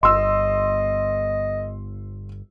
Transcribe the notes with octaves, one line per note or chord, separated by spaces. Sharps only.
G1 D#5 C6 E6